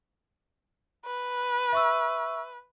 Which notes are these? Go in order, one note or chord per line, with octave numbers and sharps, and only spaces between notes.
B4
E5 C#6 E6